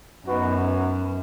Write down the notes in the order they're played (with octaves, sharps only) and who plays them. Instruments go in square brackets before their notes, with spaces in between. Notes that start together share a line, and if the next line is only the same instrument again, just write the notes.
[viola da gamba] F#2 [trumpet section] B3 D#4 F#4 B4